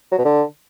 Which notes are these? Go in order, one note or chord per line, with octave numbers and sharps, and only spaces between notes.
F#3
B2
D3